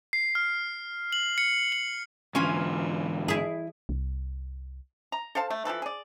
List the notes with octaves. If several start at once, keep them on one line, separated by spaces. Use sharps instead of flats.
C7
F6
F#7
C#7
F#7
G#2 D3 E3 C#4 F4 G#5
E4 G#4
C2
A#5
A4 C5 F5 A5
A3
E3 F3 A4 B4
G#4 D5